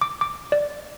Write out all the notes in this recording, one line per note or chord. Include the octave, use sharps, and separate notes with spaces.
D6
D6
D5